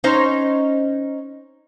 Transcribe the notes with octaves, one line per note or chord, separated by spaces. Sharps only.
C#4 D#4 C5